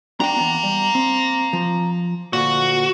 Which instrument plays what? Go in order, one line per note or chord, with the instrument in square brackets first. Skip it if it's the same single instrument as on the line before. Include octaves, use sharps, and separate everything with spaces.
[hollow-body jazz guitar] D4 F#4 G5 [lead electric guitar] F5 A#5
[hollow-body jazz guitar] E3 B3
G3
C4
F3
[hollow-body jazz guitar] D2 A#2 [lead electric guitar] F#4